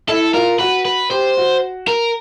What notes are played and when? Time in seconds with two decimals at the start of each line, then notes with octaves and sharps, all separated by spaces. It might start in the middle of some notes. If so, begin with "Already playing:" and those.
0.09 E4 A4
0.34 F4 A#4
0.59 F#4 B4
0.86 B4
1.11 G4 C5
1.37 F#4
1.88 A#4